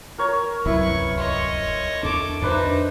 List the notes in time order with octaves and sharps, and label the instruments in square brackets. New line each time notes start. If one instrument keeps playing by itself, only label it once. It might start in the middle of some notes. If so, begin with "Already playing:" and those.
[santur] A#4 C#5
[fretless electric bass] D1 C2 F#2 [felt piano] E4 [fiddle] B4 C#6
[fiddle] C#5 D#5 [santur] C6
[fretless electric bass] E2 D4 [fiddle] A4 D6
[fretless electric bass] F2 [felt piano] D4 B4 C5 [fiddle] D#4 E5